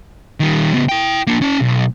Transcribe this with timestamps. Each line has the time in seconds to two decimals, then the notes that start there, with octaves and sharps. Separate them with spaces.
0.40 D#3 G3
0.73 C#3 B3
0.89 E4 G5
1.27 A#3 D4
1.42 C#4 A5
1.61 B1